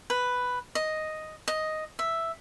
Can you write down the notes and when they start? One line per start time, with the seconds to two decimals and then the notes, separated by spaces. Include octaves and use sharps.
0.10 B4
0.75 D#5
1.48 D#5
1.99 E5